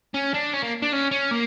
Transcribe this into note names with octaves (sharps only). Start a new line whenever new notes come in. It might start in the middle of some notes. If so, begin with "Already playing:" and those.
C#4
D4
C#4
A#3
D4
C#4
C#4
A#3